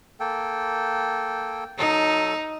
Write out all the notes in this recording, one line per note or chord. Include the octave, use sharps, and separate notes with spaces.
A#3 A4 G5
F#3 D#4 A4